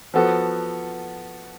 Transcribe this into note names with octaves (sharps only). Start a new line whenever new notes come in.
F3 B3 F#4 A4